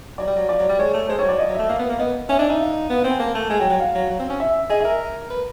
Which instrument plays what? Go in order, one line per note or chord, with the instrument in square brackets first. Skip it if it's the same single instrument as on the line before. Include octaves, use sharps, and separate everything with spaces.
[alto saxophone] F#3 [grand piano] D5
[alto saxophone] G3
F#3
[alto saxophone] F3 [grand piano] D5
[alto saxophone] F#3
G3
[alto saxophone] G#3 [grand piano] C#5
[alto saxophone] A3
[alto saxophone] G#3 [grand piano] C5
[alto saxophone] G3 [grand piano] C#5
[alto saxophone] F#3 [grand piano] D5
[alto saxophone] F3 [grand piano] D#5
[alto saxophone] F#3
[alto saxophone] A3 [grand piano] E5
[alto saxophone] A#3 [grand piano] F5
[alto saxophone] B3
A#3
[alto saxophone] B3 [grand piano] D#5
[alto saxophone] C#4 [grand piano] E5
[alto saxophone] D4 [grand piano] D#5
[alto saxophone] D#4 [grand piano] E5
[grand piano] F5
[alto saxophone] B3 [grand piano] F5
[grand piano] F#5
[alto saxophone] C4
[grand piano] G#5
[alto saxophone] A#3 [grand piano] A5
[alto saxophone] A3
[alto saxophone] G#3 [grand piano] G#5
[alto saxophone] F#3 [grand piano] G5
[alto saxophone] F#3 [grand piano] F#5
[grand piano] F5
[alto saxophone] F#3
F#3
C4
C#4
[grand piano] E5
[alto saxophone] G#4 [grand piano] D#5
[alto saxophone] A#4 [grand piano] E5
[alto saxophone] B4